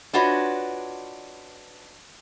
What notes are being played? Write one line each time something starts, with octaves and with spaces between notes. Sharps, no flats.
D4 F4 F#4 B4 C#5 D#5